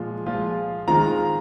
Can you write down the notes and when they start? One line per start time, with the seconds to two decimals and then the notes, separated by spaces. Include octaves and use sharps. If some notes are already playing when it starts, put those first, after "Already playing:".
Already playing: A#2 F3 G#3 F4
0.26 A#2 F3 G#3 F4
0.88 D#3 G#3 C4 F4 A#5